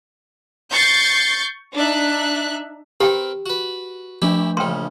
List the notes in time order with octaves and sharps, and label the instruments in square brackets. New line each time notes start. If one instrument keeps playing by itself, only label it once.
[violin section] C#6 G6 A6 C7
D4 D#4 E5 F#6
[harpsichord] C4 A#4 B4 [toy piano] G4 G5
[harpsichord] F#4 B4
[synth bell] F3 A3 D4 [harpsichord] E4 G4
[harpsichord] A#1 C#3 [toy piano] G5 C6